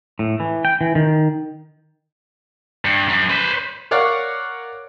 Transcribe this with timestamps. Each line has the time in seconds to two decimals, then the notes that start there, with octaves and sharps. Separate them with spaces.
0.19 A2
0.40 E3
0.65 G5
0.81 E3
0.95 D#3
2.85 G2
3.08 F#2
3.30 B4 C5
3.91 A#4 C#5 D5 F5 F#5